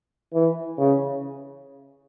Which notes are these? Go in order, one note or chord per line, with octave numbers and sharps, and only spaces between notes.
E3
C#3